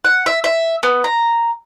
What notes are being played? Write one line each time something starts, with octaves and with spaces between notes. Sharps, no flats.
F#5
E5
E5
B3
A#5